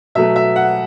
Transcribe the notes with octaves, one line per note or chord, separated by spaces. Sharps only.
B2 F#3 A3 E5
E5
F#5